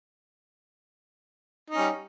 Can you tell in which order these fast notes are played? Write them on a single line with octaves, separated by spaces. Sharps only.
D#4 C#4 G3